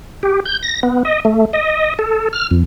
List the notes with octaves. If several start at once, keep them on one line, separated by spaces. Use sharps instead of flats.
G4
G6
A#6
B3
D#5
A3
D#5
A4
F6
F2